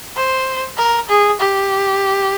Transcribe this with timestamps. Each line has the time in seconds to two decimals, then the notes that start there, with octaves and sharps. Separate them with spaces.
0.16 C5
0.77 A#4
1.08 G#4
1.40 G4